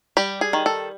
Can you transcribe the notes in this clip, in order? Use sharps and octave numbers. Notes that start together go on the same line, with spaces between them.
G3 G4
G#4
D#3
A4